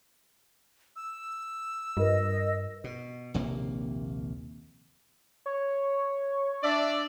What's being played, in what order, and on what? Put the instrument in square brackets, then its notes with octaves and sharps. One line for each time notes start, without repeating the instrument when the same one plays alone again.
[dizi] E6
[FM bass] G2 [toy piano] F4 A#4 B4 [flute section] D#5
[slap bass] B2
A#1 D#2 C3 A#3
[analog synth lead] C#5
[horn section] D4 D5 [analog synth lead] E5